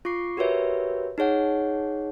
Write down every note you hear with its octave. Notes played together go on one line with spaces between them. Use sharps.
F4 C#6 D6 C7
F#4 G4 A#4 B4 C#5 E5
D#4 G#4 C#5 F#5